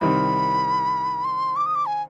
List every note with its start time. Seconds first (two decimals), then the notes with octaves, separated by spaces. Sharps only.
0.01 C2 C3 D#3 B5
1.25 C6
1.56 D6
1.66 D#6
1.75 D6
1.86 G#5